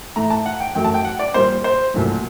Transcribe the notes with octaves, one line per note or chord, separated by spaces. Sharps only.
A2 A3 A#5
A5
F#5
G5
F#2 F#3 A3 G5
A5
G5
F#5
D5
A#2 G3 A#3 C5
C5
C2 A#2 F#3 A3